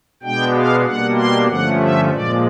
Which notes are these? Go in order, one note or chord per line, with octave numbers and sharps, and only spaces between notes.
B2 G#3 B3 D4 G5
F5
B2 G3 A#3 D4 F#5
C6
G2 D3 F3 A3 C#4 F#5
E5
A#2 F3 G#3 D5